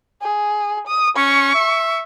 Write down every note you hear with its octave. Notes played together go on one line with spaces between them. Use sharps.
G#4
D#6
C#4 C#6
E5